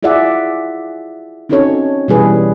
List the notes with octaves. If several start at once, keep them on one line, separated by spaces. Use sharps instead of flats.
E4 F4 G#4 D5 E5 F#5
C4 C#4 D#4 F#4 A4 C#5
B2 E3 G3 E4 G#4 B4